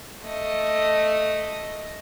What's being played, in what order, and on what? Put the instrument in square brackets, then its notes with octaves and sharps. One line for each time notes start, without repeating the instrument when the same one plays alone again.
[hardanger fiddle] A3 D#5